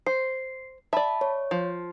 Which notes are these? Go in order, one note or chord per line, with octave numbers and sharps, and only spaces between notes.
C5 C7
D5 E5 A5 B5
C#5
F3